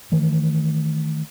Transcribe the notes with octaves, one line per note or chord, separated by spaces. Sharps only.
D#3 E3 A3